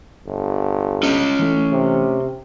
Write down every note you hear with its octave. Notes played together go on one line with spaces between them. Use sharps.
G1
C#4 D#5
E3 A3
C3